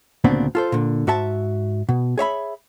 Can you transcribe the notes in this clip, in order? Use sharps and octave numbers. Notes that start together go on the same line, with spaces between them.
D2 A#2 C#3 B3 C4 D4
F4 A4 C5
A#2 D3
G#2 F#4 E5 A5
B2
G#4 C#5 E5 B5